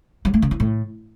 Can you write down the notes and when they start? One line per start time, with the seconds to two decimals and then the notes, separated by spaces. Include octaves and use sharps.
0.25 F#3
0.34 A3
0.42 C#3
0.51 E3
0.60 A2